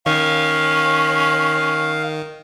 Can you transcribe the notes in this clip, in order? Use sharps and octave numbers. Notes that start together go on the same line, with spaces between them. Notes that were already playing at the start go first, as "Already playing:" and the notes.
D#3 C#4 F5